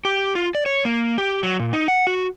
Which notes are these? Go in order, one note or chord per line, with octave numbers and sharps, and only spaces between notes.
G4
F4
D5
C#5
A#3
G4
F#3
A#2
D#4
F#5
F#4